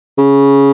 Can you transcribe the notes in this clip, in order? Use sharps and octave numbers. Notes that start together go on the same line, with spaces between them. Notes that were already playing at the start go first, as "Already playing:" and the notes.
C#3